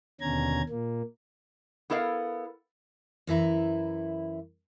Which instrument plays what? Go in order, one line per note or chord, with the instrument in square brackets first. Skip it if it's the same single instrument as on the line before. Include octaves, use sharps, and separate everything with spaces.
[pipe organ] D#2 B2 D3 C#4 A#5 G#6
A#2 A#3
[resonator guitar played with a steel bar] B3 E4 A4 A#4 D5 F5
[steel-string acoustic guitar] F#2 E3 E4 A#5